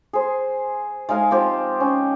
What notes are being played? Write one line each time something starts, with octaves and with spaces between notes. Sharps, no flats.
G#4 C5
G#3 D#4 F5 G#5
F3 C4 G4 C5
C#4